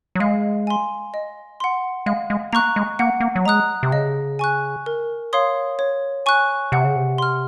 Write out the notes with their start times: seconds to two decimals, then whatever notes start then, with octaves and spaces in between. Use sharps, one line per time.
0.15 F#3
0.20 G#3 F5
0.67 G#5 C6
1.14 D#5
1.60 F#5 C6
2.06 G#3 F5
2.30 G#3
2.53 A#3 A#5 C#6 F#6
2.76 G#3
2.99 A#3 F#5
3.20 A#3
3.36 F#3
3.45 G#3 A#5 D#6 F#6
3.83 C3
3.92 C#3 D#5
4.39 G#5 C#6 F#6
4.86 A#4
5.33 C#5 F5 C6 D#6
5.79 C#5
6.26 G#5 C#6 F#6
6.72 C3 F#5
6.84 C#3
6.96 C3
7.18 C6 F6